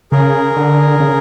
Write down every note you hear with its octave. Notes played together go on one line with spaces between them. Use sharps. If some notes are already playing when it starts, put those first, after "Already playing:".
C#3 G#4 A#4
D3
C#3